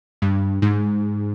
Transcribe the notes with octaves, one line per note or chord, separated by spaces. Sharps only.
G2
G#2